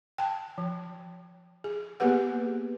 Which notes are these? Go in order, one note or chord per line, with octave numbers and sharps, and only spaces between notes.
G5 A5
F3
G#4
A#3 B3 G4 G#4 B4 F#5